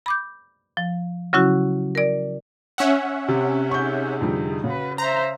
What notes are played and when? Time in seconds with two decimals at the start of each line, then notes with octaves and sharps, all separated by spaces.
0.06 B5 D6 G6
0.77 F3
1.33 C#3 F#3 C#4 E4 F#4
1.95 A#4 D5
2.78 C#4 E5 F#5
3.28 C3
3.71 D#4 G#4 C#6 G6
4.21 F2 D3 G3
4.64 C#3 F#4 B4
4.98 C5 E5 A#5